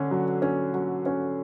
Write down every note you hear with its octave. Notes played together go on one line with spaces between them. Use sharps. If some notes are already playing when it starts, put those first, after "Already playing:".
Already playing: D3 C#4
F#3
C#4
F#3
C#4